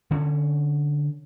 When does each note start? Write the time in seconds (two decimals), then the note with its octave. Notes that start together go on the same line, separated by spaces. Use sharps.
0.11 D3 C#4